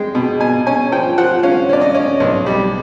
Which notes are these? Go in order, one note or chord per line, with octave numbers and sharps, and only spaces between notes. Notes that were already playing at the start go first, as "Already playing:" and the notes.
Already playing: G#3 G5
B2
B2 G#5
C#4 G#5
F3 G5
F3 F#5
C#4 F5
C#4 D5
D#5
C#4
B1
G3